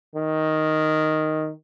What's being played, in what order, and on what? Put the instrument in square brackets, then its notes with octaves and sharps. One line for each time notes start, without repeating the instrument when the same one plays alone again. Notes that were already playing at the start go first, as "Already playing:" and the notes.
[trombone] D#3